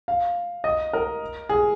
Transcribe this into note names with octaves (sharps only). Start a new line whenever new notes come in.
F5
D#5
A#4
G#4